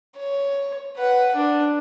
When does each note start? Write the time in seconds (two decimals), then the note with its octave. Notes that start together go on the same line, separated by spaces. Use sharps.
0.16 C#5
0.97 B4 F#5
1.35 D4